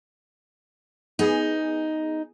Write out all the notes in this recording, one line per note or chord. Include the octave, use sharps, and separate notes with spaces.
B3 D#4 G#4